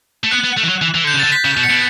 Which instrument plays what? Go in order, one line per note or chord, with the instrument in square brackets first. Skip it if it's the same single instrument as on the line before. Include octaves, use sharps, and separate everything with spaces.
[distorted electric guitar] A3
[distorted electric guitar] B3 [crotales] F#6
[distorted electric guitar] B3
A3
E3
F#3
E3
E3
[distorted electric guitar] D3 [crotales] G6
[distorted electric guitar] C#3
[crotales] A6
[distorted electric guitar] D3
[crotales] B6
[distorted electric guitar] C#3
B2
[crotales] C#7
[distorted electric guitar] B2